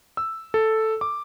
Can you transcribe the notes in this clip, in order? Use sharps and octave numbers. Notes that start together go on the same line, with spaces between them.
E6
A4
D6